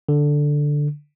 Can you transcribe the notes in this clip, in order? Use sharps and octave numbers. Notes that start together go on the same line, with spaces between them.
D3